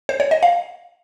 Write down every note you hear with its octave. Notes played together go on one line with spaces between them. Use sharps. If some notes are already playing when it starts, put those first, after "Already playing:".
C5
C#5
D#5
F5